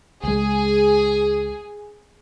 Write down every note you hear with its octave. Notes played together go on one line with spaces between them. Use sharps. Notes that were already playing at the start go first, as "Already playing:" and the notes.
C#2 G#3 G#4